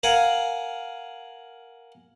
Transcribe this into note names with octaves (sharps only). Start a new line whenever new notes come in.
A#4 F5 F#5 G#5 A#5